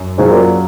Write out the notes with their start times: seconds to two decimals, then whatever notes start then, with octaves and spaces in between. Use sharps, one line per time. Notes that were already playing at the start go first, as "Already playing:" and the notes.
Already playing: F#2
0.18 G#2 C#3 F#3 C#4
0.31 A#2